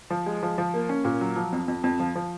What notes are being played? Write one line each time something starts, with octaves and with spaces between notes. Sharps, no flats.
F3
G#3
F3
F3
A#3
C#4
A#2
F#3
F3
F2
F2
F2
F3
F3